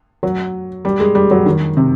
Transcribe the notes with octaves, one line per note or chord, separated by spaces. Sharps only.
F#3
G3
G#3
G3
F#3
D#3
C3